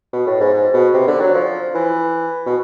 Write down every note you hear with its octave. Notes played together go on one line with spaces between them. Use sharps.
B2
A2
G#2
G#2
B2
C3
D3
F#3
F3
E3
B2